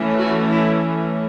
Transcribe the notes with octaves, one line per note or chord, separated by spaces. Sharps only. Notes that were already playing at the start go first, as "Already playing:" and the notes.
Already playing: E3 A3 C#4
F#4
E4